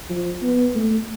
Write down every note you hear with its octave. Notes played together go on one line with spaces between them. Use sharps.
F3
B3
A3